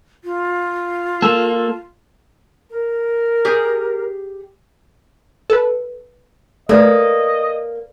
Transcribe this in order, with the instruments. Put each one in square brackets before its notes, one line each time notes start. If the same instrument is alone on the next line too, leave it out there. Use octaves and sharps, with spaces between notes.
[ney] F4
[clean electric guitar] A#3 A4
[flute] A#4
[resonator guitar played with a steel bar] G4 G#4
[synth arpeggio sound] A4 B4
[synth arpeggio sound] A3 [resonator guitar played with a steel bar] A#3 [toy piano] A4 B4 D5 [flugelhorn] D#5